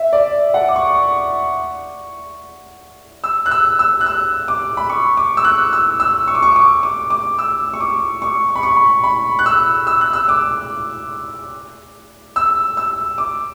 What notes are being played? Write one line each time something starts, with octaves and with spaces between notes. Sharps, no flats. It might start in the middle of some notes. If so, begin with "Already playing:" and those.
Already playing: E5
D5
F#5
D6
C#6
E6
F#6
E6
E6
F#6
E6
D6
B5
C#6
D6
E6
F#6
E6
E6
C#6
D6
C#6
D6
D6
D6
E6
C#6
D6
C#6
C#6
B5
C#6
B5
B5
F#6
E6
E6
F#6
E6
D6
E6
E6
D6